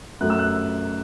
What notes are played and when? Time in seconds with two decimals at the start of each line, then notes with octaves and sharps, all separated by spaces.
0.21 F#2 F#3 A3 F#6
0.30 E6
0.39 F#6